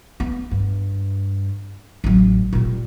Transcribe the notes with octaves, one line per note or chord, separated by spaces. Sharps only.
B3
G2
A1 F#3
A#2 G3